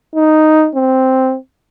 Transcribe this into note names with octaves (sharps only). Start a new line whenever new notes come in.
D#4
C4